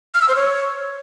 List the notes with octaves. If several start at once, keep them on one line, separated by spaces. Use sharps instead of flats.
F6
E6
C5
C#5